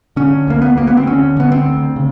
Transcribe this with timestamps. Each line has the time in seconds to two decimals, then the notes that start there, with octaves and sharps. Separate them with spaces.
0.16 D3 C#4
0.47 D2 A#3
0.62 B3
0.77 D2 A#3
0.87 B3
0.97 C4
1.07 D3 C#4
1.37 D3 B3
1.52 C4
1.66 D2
1.96 C#3